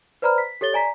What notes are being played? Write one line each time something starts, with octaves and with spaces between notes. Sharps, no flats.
B4 C5 D5 A#5 B5 F6
B6
G4 A4 C#5 A6 G7
D5 G#5 A#5 B6